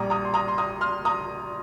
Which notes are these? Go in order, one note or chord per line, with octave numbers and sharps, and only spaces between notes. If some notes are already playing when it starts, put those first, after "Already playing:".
Already playing: A#1 A#2 G3 A#5 D#6
A#5 D#6
C6
A#5 D#6
C6
A#5 D#6
C6 F6
A#5 D#6